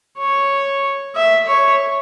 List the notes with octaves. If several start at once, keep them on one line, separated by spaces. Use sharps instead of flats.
C#5
E5
C#5